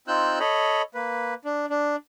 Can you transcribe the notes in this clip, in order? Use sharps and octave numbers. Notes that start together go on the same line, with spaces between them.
C4 D#4 F4 E6 F#6 G6
A4 C#5 D#5 B5
A#3 B4
D4
D4